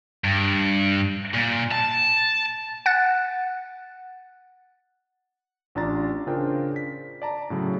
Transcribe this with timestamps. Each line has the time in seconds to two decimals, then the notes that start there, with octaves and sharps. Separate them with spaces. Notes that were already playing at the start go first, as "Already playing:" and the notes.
0.24 G2
1.34 A#2
1.71 A5
2.86 F#5 F#6 A6
5.75 A1 D4 F4 D5 A#5 A6
6.27 C#3 D4 F4 A#4 C5 G5
6.76 B6
7.22 D5 A5 A#5
7.50 A2 C#3 F#3